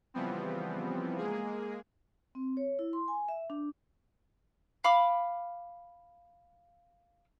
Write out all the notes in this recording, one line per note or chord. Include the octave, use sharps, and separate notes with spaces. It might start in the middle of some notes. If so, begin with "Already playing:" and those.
C#3 E3 F3 G3 B3 C4
G#3 A#3 G#4
C4
C#5
E4
C6
G#5
E5
D4
F5 B5 D6